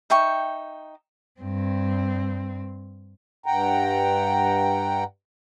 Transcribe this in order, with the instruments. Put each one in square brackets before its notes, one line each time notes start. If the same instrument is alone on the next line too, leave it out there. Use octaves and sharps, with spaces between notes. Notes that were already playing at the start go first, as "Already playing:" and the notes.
[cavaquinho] D#4 E5 G5 C#6
[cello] G2 C4
[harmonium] G2 F#5 G5 A#5